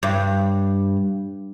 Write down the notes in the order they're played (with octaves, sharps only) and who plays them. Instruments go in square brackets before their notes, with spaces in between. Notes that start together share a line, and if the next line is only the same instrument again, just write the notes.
[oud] G2